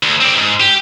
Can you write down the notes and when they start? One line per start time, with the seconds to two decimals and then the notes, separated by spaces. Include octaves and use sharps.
0.03 D2
0.21 C4 D5
0.36 G#2
0.60 G4